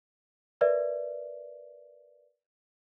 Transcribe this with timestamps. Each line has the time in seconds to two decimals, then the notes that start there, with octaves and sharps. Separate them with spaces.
0.61 A#4 B4 D5 E5